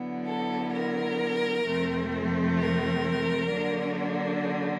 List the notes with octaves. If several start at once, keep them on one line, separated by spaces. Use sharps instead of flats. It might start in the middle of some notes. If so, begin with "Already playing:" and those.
Already playing: D3 F#3 B3 E4
A4
A#4
F2 C3 F3 A3 C4
A#4
D3 F#3 A#3 D4